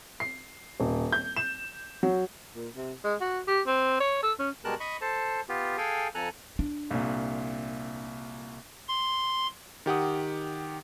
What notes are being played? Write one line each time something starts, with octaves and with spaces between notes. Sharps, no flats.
C7
D#1
G6
E7
F#3
A#2
C3
G#3
F#4
G4
C4
C#5
A4
C#4
B2 G3 G#3 A#4 A5 F#6
D#5 B5 C#6
A4 C5 A5
B3 F4 G4
G#4 A4 F5 G5 G#5
F2 A4 G#5 A#5 F#6
D4
C2 A#2
C6
D#3 G4 F#5 D#6